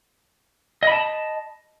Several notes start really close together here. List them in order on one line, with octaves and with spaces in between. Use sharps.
D#5 B5 A5